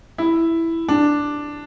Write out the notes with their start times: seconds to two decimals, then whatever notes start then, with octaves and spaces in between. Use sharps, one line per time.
0.18 E4
0.88 D4